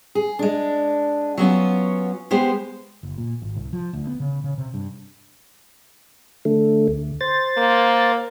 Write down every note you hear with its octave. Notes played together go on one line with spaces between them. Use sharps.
G#4
G#3 D4
F#3 B3 C#4 F4
G#3 B3 G4 C5
F#1
A#2
G#1
C2
F3
D2
B3
C#3
C#3
C3
G2
D3 A3
D2
C5 A6
A#3